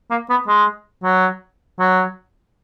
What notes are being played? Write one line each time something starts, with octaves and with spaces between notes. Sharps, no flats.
A#3
B3
G#3
F#3
F#3